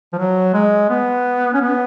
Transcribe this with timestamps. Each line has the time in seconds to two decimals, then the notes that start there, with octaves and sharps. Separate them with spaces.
0.13 F3
0.18 F#3
0.54 G#3
0.90 B3
1.54 C#4
1.62 B3